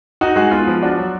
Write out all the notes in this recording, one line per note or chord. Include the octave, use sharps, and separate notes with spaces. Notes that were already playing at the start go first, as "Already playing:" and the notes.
D#4 F#4
G#3 F#4
B3 F4
F3
D4 F#4
F#3